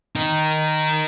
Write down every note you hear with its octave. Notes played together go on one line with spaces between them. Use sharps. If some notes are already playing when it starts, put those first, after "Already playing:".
D#4 A#4